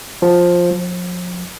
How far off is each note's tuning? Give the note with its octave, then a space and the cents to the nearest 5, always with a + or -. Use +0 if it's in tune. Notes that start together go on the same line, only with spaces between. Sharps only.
F3 +10
F3 +40